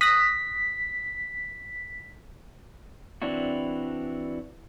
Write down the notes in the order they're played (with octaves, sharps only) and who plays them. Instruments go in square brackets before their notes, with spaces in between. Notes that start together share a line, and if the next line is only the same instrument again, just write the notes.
[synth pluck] D#6 F#6 A#6 [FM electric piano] B6
[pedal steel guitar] E3 C4 D4 E4 F#4